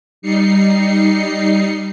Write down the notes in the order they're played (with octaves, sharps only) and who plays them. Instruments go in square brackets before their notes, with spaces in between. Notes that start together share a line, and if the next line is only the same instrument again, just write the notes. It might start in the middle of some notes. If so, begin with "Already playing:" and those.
[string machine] G3 D#4 C7 C#7